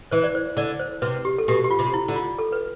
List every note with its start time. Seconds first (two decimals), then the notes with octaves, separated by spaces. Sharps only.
0.11 E3 C5
0.24 D5
0.35 C5
0.57 D3 D5
0.80 C5
1.02 C3 B4
1.25 G4
1.38 A4
1.48 B2 G4
1.64 G4
1.71 F4
1.79 C3
1.94 E4
2.08 D3
2.16 F4
2.39 A4
2.52 B4